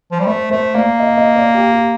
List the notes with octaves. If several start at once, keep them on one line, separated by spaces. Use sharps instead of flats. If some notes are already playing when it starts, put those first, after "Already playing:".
F3
G3
A3 C5
A3 C5
A#3 D5
D#5
D#5
D5
G4
G4